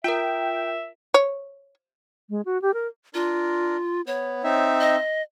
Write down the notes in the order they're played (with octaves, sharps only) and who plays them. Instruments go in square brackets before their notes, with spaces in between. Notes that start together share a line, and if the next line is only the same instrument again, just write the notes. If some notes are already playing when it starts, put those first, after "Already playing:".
[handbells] F4 A#4 [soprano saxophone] E5 [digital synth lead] G5
[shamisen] C#5
[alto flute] G#3
F#4
G4
A#4
[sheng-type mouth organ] D4 A#4 [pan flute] F4
[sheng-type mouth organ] B3 [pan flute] C#5
[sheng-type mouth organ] C4 D#4 E5
[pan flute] D#5